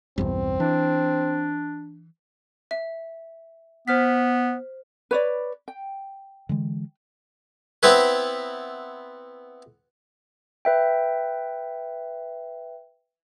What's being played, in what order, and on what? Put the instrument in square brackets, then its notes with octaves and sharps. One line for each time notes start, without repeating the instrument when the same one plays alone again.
[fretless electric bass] B1 E2 G2 [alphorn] C4
[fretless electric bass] E3 [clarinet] D4
[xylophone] E5
[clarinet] B3 [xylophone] C5 F6 B6
[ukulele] B4 C#5 D5
G5
[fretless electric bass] D3 E3 G#3
[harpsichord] B3 C4 E4 B4
[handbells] B4 E5 G5